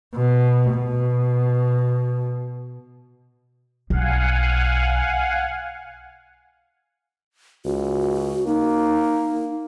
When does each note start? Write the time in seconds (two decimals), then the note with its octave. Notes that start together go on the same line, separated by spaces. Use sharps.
0.15 B2
0.74 B2
3.90 B1 F5 F#5 G#5
7.65 C#2 F#4
8.47 A#3 D#4